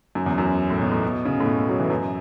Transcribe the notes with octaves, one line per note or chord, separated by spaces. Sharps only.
F#2
E2
F#2
A2
B2
A2
B2
C#3
A2
B2
A2
F#3
E3
F#2